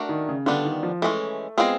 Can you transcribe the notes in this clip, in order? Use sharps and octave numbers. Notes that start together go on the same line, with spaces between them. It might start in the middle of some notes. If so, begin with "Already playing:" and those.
Already playing: A3 D4 F#4 A#4
D#3
C#3
D3 G3 B3 D4 F4
D#3
F3
E3 G#3 A3 C#4
G#3 B3 C4 F4 G#4